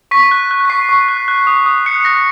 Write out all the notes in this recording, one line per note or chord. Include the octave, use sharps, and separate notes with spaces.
C#6 B6
F#6
F#6
B6
C#6 C7
C#6
F#6
F#6
D#6
D#6
F#6 C#7
F#6 A#6